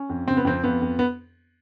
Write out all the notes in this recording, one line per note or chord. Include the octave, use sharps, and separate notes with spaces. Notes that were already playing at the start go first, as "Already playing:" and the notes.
Already playing: C#4
F2
C#3 C4
B3
F2 C4
F2 B3
F2
B3